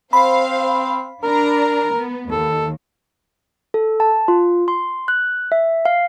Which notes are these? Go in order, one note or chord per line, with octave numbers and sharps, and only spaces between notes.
C4 C5 F5 B5
D4 A#4 A#5
B3
D#2 A4
A4
A5
F4
C6
F#6
E5
F5